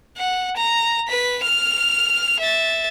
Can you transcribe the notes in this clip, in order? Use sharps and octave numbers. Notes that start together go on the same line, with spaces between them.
F#5
A#5
B4 B6
F6 F7
E5 A6